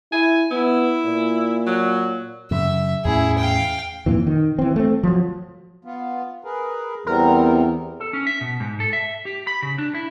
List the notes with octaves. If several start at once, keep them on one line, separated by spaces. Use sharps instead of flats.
E4 G#5
B3 E4
A#2
F#3
F#2 C#3 E5
E2 A2 C#4 E4 G#4
F5 G5
F2 A#2 E3
D#3
E3 C4
A3 C4
F3 F#3
B3 F4
G#4 A#4 B4
E2 G3 B3 C4 A#4
A4
C#4
E5
B2
G#2
A4
E5
G4
B5
C#3
D4
E4